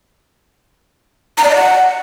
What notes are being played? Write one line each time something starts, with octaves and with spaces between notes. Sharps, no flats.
A#5
D5
D#5
F#5